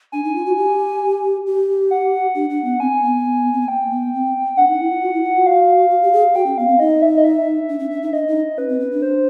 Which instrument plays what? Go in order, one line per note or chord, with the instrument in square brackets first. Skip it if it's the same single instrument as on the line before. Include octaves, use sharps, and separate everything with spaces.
[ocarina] D4 [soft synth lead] G#5
[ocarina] D#4
F4
F#4
G4
G4
[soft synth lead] F#5
[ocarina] D4
D4
B3
[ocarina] C4 [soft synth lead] G#5
[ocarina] B3
C4
B3
[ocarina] A#3 [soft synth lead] G5
[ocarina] B3
C4
[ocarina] D4 [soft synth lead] F#5
[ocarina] D#4
E4
F4
F#4
E4
F4
F#4
[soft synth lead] F5
[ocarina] F#4
G4
G#4
[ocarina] F#4 [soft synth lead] G5
[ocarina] C#4
[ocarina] B3 [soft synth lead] F5
[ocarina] C4
[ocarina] D#4 [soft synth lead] D#5
[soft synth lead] E5
D#5
E5
[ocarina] D4
C#4
D4
D#4
[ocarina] D4 [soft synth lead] D#5
[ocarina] D#4
[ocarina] C#4 [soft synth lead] B4
[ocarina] C4
C#4
D4
[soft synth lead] C5